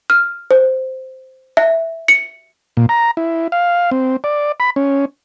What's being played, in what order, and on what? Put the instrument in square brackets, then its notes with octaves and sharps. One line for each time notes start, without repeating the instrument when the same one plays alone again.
[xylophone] F6
C5
E5
C#7
[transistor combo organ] A#2
A#5
E4
F5
C4
D5
B5
C#4